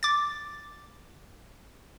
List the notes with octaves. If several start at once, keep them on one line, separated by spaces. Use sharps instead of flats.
D6 A6